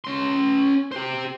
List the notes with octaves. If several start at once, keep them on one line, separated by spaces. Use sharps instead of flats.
C#4 C6
G4 C5